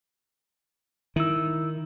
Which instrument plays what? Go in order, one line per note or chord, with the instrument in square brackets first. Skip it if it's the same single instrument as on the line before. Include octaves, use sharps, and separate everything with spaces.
[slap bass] D#3 [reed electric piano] E4 E6